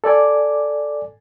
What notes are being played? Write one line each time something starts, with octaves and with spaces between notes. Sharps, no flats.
A4 D5 G#5 D6